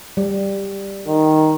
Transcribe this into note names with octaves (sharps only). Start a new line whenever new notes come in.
G3
D#3